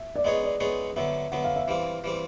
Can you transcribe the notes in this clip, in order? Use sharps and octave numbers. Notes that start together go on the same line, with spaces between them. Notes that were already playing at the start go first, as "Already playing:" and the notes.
Already playing: E5
D5
G#3 B3 D#4 G#4 C#5 D#5
D5
G#3 B3 D#4 G#4 C#5
D3 F#3 B3 E5
D3 F#3 B3 F#5
F5
E5
E3 G3 C4 F5
E3 G3 C4